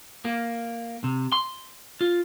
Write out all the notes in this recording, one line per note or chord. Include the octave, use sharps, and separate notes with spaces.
A#3
C3
C6
F4